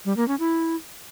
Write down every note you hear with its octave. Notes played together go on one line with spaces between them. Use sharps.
G3
A#3
C#4
E4